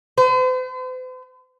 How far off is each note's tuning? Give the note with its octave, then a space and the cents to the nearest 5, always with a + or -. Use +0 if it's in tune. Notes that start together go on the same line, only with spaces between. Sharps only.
C5 -45